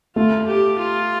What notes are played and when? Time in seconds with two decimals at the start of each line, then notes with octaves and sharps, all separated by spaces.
0.16 A3 F4
0.48 G4
0.79 F4